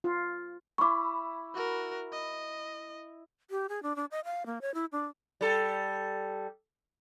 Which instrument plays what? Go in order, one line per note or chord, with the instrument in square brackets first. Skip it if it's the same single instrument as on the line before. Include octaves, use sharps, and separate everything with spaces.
[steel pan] F4
[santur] E4 B5 [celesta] C#6 D6
[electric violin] F#4 A#4
D#5
[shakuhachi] G4
G#4
D4
D4
D#5
F5
A#3
C#5
E4
D4
[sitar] G3 A4